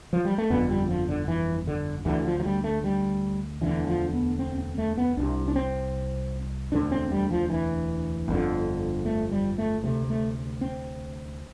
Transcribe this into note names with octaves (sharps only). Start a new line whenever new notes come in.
F3
G3
A3
G1 F2 D3 B3
G3
F3
D3
E3
D3
D2 D3 E3
F3
F3
G3
A3
G3
E1 D2 D3 E3
F3
B3
C4
C4
A3
B3
C2 C3 D4
D4
C4
E1 D2 D3 D4
C4
G3
F3
E3
G1 F2 D3
A3
G3
A3
D2 C3 A3
A3
C4